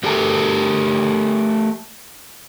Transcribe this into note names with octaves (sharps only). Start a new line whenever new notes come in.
A3 G4 A4 A#4 A5